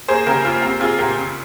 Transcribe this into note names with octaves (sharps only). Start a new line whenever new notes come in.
A#3 G#4 C5
C#3 G4 A#4
A#3 F4
C4 G4
C4 F4 G#4
A#2 G4 A#4
C#3